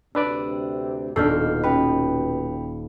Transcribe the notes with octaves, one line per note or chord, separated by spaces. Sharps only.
D2 C3 D4 B4 D5 E6
D#1 B2 D4 A4 F6 G6 C7
C#4 B4 G5 B5